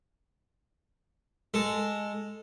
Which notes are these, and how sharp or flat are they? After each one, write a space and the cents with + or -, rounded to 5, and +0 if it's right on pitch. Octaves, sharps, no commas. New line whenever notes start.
G#3 +0 A4 +0